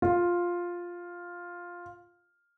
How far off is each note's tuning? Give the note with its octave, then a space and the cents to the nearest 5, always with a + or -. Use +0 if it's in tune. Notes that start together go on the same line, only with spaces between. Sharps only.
F4 +5